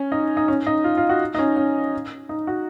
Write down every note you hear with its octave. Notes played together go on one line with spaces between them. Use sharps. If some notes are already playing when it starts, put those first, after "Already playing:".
Already playing: C#4
D#4
D#4
C#4
D#4
F4
F4
F#4
D#4
C#4
C#4
D#4
F#4